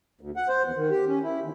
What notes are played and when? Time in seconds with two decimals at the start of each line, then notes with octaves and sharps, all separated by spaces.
0.21 D2
0.36 F#5
0.48 C5
0.64 E2
0.76 D#3
0.91 G4
1.07 C#4
1.23 E4
1.40 D#2